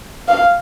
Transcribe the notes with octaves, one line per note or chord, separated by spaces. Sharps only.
F5